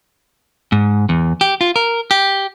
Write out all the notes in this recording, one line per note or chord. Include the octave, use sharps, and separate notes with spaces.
G#2
E2
G4
F4
A#4
G4